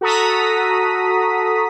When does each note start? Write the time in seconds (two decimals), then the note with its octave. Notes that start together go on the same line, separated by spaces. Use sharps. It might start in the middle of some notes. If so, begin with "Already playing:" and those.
0.01 F#4 A4 A#5 D#6 B6